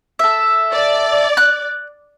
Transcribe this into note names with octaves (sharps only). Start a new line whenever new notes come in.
A4 E5
D5
F#6